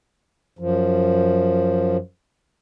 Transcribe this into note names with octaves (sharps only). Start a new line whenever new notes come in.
F#2 F3